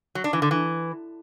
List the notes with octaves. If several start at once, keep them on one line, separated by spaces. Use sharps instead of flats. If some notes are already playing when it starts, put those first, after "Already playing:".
F#3
D4
E3
D3
E3